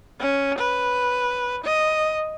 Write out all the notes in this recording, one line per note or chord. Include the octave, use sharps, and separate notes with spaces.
C#4
B4
D#5